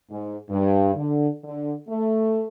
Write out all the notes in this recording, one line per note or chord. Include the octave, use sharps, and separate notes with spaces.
G#2
G2
D3
D3
A3